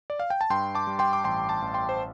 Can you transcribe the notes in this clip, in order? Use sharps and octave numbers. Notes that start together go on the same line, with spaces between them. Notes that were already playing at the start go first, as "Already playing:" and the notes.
D5
F5
G5
A5
G2 G5 C6
A5 D6
G3
G5 C6
D6
A1 G5 C6
A5 D6
A1
G5 C6
C5